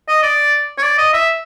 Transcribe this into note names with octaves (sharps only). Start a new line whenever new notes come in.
D#5
D5
C#5
D5
D#5
E5